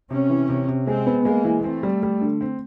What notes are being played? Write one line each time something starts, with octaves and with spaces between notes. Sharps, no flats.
C3 C#4
E3
C3
C3
G#3 C4
B3
G#3 A#3
E3
A3 C4
G3
G3
D3
C4